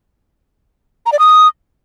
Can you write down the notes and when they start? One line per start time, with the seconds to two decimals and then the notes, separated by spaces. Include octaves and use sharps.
1.06 A#5
1.12 D5
1.19 D#6